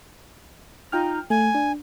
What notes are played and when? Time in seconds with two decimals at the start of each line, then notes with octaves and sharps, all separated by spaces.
0.92 D#4 F4 G5 F6
1.30 A3 G#5
1.55 D4